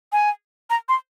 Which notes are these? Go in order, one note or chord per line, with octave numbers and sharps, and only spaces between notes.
G#5
A#5
C6